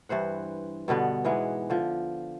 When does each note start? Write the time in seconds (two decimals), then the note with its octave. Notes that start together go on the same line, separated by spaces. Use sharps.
0.09 G2 E3 C5 F#5
0.88 G2 B2 D3 B3
1.24 G#2 E3 G#3 B3
1.70 D3 F3